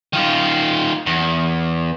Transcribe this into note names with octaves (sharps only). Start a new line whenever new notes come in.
D#3 F4
E2